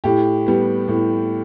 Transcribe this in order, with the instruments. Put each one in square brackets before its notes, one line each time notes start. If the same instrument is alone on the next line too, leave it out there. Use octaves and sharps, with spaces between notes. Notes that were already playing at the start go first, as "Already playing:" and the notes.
[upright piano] A2 G4
G3 B3
A2